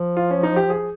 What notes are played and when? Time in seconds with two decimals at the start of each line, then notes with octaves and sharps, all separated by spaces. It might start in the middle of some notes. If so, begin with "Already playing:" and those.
Already playing: F3
0.17 F4
0.31 C#4
0.43 D#4
0.56 G4
0.70 G#4